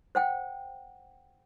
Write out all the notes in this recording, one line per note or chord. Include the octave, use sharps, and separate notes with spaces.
C5 F#5 G5